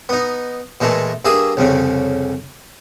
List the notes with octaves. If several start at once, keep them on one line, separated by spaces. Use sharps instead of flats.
B3 D#4
A#2 E3 G#3 A3
G2 A#3 G#4 E5 D#6
C2 F2 C#3